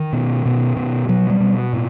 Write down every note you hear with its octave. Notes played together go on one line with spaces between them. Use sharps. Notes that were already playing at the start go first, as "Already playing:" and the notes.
Already playing: D#3
B2
B2
B2
B2 F#3
G3
B2
A2